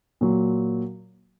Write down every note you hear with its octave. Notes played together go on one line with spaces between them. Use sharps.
A#2 F#3